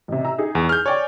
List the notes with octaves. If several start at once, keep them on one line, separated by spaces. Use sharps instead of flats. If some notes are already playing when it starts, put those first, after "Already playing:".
A1 C3
A#5 E6
D#4 G4 G#4
E2
F6 G6
C#5 D5 G5 G#5